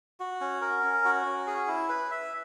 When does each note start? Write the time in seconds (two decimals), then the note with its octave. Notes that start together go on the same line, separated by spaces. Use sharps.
0.20 F#4
0.41 C#4
0.61 A#4
0.83 C#4
1.05 F#4
1.26 C#4
1.47 G#4
1.68 E4
1.89 B4
2.11 E5